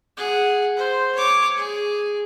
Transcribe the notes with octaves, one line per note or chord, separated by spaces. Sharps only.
G#4 F#5
C5
C#5 D6
G#4